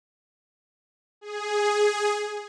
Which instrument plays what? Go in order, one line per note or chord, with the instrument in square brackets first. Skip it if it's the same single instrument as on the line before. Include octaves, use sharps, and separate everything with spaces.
[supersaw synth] G#4